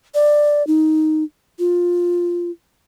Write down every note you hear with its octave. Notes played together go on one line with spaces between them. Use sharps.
D5
D#4
F4